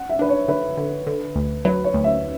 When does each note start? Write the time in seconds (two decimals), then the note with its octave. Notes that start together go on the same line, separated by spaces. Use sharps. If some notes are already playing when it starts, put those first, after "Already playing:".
Already playing: F#5
0.09 E5
0.19 D4 B4
0.29 C#5
0.48 D3 B4
0.77 D3
1.07 D3
1.36 D2
1.65 F#3 B4
1.84 C#5
1.94 D2
2.04 E5